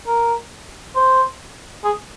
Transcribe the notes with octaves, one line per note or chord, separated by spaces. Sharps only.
A#4
C5
G#4